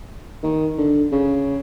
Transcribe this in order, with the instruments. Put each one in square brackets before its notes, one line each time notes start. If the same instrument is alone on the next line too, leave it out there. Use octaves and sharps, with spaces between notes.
[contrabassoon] D#3
D3
C#3